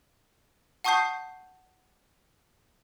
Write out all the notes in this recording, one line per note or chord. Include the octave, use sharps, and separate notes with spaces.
F#5 A5 C#6 D#6 G6 C7